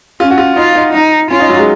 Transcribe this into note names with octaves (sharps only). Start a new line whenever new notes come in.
C#4 F4
F#4
F4
D#4 F4
D#4
D#4
C#4 F4
D#4
F#3
G#3